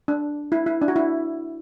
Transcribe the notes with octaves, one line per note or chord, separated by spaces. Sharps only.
D4
E4
E4
D4
F#4
E4